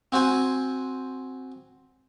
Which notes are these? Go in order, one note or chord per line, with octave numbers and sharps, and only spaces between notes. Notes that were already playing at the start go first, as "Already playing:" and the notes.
C4 F#4 C5 G#5